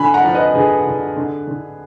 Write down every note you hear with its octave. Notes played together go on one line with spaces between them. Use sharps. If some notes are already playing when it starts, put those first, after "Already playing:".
Already playing: D3 G#5 B5
F#5 A#5
F3
B4 D#5
D3 G#4 B4
D3
D3
D3